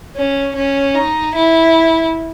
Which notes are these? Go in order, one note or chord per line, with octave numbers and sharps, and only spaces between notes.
C#4
C#4
D#4
E4